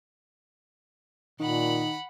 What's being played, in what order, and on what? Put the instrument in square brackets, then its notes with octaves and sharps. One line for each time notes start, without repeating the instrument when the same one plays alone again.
[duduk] A#2 [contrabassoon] D#3 [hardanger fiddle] F#5 B5